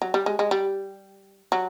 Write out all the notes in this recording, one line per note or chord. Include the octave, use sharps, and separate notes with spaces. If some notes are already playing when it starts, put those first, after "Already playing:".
F#3
G3
G#3
G#3
G3
F#3